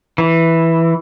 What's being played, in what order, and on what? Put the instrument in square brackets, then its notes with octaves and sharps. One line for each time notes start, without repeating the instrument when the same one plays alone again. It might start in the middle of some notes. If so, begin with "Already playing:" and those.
[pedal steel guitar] E3